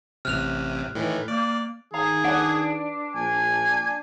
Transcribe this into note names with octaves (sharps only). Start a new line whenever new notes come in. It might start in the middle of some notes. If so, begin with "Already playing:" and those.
A1 C3 F6 F#6 F7
A2 D#3 E3
A#3 D5
D#3 G#4 F5 A#5
D4 B4 D5 F#5
A#1 G#5